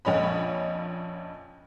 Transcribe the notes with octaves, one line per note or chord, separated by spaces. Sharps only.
A#1 F2 C#4 D#5 B5